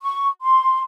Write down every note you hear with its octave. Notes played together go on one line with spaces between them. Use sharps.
C#6
C6